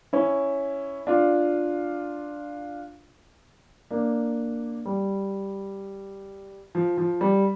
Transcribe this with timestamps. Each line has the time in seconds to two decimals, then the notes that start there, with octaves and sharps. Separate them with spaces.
0.13 C#4 E4
1.07 D4 F4
3.91 A#3 D4
4.86 G3
6.75 F3
6.98 F3
7.21 G3